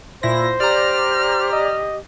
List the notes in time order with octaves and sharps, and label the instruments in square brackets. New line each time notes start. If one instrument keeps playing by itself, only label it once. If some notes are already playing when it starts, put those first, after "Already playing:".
[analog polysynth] A#2 E4 A#6 [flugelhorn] C5
[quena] G4 [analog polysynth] D5 A#5 [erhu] F6
[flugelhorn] D#5